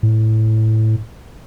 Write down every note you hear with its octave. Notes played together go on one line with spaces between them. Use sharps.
A2